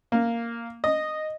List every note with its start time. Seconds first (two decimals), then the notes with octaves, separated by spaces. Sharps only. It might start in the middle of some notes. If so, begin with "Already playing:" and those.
0.12 A#3
0.84 D#5